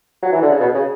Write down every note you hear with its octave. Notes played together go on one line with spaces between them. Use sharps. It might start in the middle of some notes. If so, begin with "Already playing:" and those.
F#3
E3
D3
C#3
B2
C#3